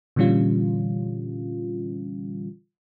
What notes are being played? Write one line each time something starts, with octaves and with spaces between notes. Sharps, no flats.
A#2 D3 E3 G3 C#4 F4